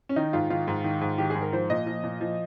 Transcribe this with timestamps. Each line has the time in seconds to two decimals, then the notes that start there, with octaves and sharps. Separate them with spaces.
0.09 C#4
0.16 D#3 D#4
0.33 G#2 F4
0.50 D#3 F4
0.68 G#2
0.84 D#3
1.01 G#2
1.18 D#3 G4
1.30 G#4
1.35 G#2
1.41 A#4
1.52 F3 C5
1.70 A#2 D#5
1.86 F3
2.04 A#2
2.21 F3